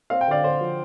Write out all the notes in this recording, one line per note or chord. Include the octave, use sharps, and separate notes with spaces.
C4 F5
G5
D3 D5 F5
D3 C5
F3